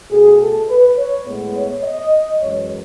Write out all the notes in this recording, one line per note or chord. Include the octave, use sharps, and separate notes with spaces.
B2 A3 G#4
A4
B4
C#5
A2 G#3 B3
C#5
D#5
F#2 E3 G#3 C#5